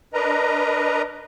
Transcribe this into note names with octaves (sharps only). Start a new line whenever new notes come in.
D4 A#4 B4 D#5 A#5